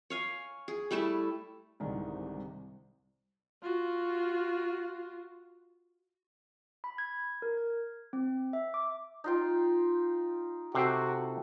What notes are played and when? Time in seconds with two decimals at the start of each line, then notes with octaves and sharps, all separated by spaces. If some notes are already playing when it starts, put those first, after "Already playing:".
0.10 C#5 F5 G#5
0.68 G#4
0.91 G3 A3 E4 A5
1.80 C2 G#2 D3 D#3
3.62 F4 F#4
6.84 B5
6.98 G#6
7.42 A#4
7.58 G#6
8.13 C4
8.53 E5
8.74 D6
9.24 D#4 F4 G5
10.75 C3 F#4 A4 C5 G5